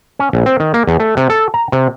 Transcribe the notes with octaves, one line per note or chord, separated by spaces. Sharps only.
C#4
A#1
C4
D#3
A#3
E2
A3
C3
A4
A#5
C3